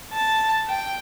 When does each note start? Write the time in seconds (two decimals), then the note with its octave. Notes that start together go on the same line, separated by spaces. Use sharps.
0.12 A5
0.68 G5